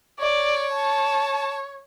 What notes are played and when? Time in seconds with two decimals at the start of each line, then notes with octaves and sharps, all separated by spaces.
0.20 C#5 D5
0.73 A5